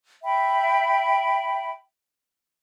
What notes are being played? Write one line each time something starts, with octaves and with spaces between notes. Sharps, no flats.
E5 G5 B5